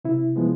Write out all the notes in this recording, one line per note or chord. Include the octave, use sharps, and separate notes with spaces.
C3 E4
F3 G#3 B3